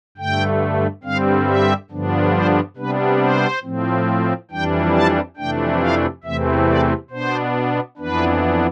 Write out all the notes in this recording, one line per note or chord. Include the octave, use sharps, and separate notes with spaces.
G2 D3 A3 G5
G2 D3 G3 C4 F5
E5
G2 D3 F3 B3 D4
C5
C3 G3 B3 D4 B4
C5
A2 F3 C4
F2 E3 G3 D4 G5
A5
F2 C3 E3 A3 D4 G5
F5
E2 C3 E3 A3 C4 E5
D5
B2 B3 D4 C5
F2 E3 B3 D4 B4